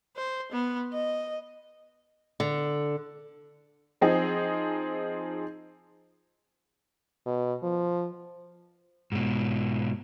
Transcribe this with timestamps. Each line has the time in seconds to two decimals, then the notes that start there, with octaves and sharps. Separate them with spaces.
0.17 C5
0.52 B3
0.93 D#5
2.40 D3
4.01 F3 C4 D#4 G#4
7.26 B2
7.63 F3
9.12 G#2 B2